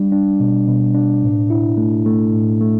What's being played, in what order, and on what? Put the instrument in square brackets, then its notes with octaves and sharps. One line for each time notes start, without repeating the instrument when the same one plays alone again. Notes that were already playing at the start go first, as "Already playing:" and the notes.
Already playing: [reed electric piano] G3 D4
D4
B2
B2
D4
A2
E4
A3
A3
A2
A3